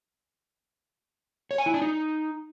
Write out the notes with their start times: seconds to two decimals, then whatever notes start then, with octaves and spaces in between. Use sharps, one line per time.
1.51 C#5
1.58 G#5
1.66 E4
1.74 D4
1.82 D#4